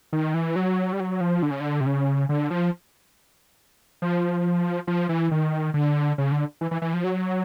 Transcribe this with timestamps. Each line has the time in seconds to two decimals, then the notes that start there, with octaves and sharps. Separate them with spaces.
0.13 D#3
0.34 E3
0.56 F#3
0.93 G3
1.00 F#3
1.21 F3
1.42 D3
1.51 C#3
1.60 D3
1.81 C3
1.86 C#3
2.29 D3
2.50 F3
4.02 F3
4.87 F3
5.09 E3
5.31 D#3
5.74 D3
6.18 C#3
6.32 D3
6.61 E3
6.71 E3
6.82 E3
6.94 F3
7.04 F#3